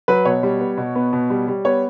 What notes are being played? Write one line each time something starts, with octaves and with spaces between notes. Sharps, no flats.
F#3 B4
B2 C#5
G3
B3
B2
B3
B2
G3
G3
B3 C#5